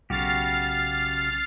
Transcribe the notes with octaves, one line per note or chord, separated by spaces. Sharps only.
B1 C#3 F#4 G4 F6 A6 C7